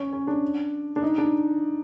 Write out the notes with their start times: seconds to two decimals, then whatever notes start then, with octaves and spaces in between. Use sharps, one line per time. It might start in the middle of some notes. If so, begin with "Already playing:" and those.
Already playing: C#4
0.13 C#4
0.27 D4
0.96 D4
1.03 D#4
1.18 D4